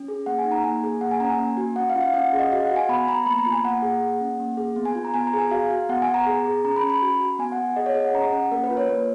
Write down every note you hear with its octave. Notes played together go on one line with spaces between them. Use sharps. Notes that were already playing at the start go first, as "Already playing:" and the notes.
Already playing: C#4
G#4
A#3 F#5
G#5
D#4
A#5
A#3 G#5
G#4
A#3 F#5
G#5
C#4 A#5
G#5
A#3
F#4
C#4 F#5
F5
F4
F5
C#4 F#5
G#4
D#5
F#4 F5
F#5
F#4
G#5
B3 B5
B3 A#5
A#3 B5
A#5
F4
G#5
A#3 F#5
G#4
A#3
C#4
A#3
G#4
B3
G#5
F4
A#5
B3 G#5
A#5
G#4
G#5
F#4 F5
F#4
B3 F#5
G#5
B3
A#5
G#4
G#4
C#4 A#5
B5
C#4
B5
F#4
F#4
B3 G#5
F#5
B3
G#4 D#5
C#5
G#4 D#5
F#5
C#4 A#5
C#4 F#5
A#3 A#4
B4
F4
C#5
A#3